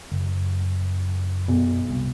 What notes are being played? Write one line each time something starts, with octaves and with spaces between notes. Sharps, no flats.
F#1
B1
C2